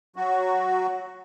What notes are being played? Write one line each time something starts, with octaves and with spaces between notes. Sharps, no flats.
F#3 F#4